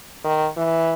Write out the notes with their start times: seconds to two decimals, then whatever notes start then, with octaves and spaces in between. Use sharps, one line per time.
0.24 D#3
0.57 E3